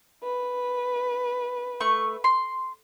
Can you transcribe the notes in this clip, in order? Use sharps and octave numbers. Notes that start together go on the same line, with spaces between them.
B4
A3 C#6
C6